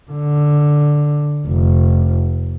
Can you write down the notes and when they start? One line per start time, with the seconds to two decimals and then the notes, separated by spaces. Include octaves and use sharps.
0.11 D3
1.47 F1